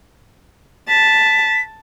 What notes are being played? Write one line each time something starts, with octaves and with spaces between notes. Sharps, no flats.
A5 B6